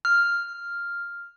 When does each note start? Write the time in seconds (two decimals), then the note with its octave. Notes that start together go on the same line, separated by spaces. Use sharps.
0.05 F6